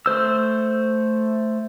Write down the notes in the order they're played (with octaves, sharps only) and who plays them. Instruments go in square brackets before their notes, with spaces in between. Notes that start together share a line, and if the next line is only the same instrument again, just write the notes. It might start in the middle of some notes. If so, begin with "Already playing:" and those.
[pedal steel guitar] A3 C5 E6